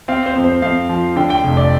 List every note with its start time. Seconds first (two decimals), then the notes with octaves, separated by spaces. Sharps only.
0.08 C4 F5
0.26 C5
0.35 F2
0.44 C5
0.62 F2 F5
0.89 F3
1.16 D3 G5
1.30 G5
1.44 F1
1.57 D5